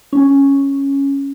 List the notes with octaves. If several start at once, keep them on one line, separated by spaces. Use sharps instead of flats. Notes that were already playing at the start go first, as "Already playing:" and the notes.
C#4